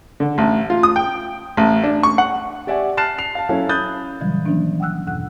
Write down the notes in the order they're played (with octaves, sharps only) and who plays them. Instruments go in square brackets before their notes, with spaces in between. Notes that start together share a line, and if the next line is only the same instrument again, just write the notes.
[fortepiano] D3
A1
F4
D#6
G5
A1
D4
C#6
F#5
[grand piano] G4 D5 E5 F#5 G#5
A5 F6 F#6 A6 C7 E7
C7 F7
F5 A5
F#3 C#4 E4 A4 F5
B5 D#6 F#6 G6 A6
[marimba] A#2 C#3 E3 F#3 G3
D#3 E3 F#3 A#3 C#4 D4
F#5 G5 D#6 E6 F#6
E2 G2 B2 F#5 F#6